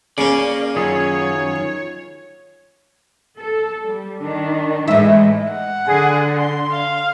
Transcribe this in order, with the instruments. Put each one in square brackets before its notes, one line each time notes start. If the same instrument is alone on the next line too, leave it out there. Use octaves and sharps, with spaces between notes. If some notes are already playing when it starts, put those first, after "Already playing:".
[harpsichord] C#3 C#4 [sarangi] A#3 [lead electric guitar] D5
[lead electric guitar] F#2 [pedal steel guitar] D#3 F4 G#4 [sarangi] C#5
[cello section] A4
G3
D#3 D4
[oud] A2 E5 [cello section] E3 G#3 D#4
[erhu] F#5
[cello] D3 [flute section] G#4
[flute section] C6
[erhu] F5